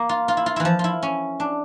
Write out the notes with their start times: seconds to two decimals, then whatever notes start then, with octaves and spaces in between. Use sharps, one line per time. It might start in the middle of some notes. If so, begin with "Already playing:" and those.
Already playing: A#3
0.09 F4
0.28 F4
0.37 E4
0.46 F4
0.56 E3 E4
0.65 F3
0.79 E4 F4
1.03 C#4
1.40 D4